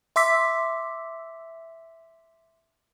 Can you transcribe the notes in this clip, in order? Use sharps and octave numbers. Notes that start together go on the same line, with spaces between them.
E5 C6 D6 E6 B6